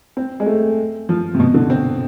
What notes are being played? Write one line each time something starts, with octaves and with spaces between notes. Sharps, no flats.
C4
G#3
A3
F3
C3
B2
D3
C4